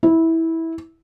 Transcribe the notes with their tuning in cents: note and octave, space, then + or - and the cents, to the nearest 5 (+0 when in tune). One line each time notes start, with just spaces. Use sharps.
E4 -15